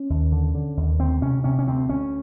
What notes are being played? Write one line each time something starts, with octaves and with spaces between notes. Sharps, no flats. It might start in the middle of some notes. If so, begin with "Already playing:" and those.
Already playing: C#4
D#2
D3
D3
D#2
D2 C4
C3 C#4
C3 C#4
C#4
D2 C4
D2 C#4